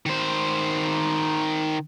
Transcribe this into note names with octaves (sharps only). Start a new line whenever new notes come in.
D#3 C5